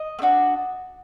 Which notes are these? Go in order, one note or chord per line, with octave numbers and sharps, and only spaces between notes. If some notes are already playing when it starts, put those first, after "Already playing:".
Already playing: D#5
A3
D4 F#4